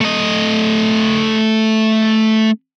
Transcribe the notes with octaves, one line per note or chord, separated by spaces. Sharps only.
A3 D#5